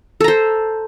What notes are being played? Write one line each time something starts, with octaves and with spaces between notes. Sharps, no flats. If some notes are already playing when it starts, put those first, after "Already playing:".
A4 C5 A#5